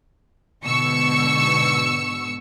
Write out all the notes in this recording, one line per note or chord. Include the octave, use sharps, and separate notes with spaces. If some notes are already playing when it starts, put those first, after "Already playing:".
G#2 B2 D3 C#6 E6 C#7